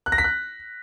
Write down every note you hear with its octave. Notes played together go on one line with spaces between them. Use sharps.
F#6
A#6
B6
F#6